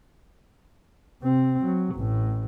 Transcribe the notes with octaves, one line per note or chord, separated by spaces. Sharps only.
C3 C4
F#3
A1 A2